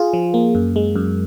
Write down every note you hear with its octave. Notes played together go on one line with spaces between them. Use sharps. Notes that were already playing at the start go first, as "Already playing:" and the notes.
Already playing: F4 G#4
F3
A#3
F#2
G#3
F#2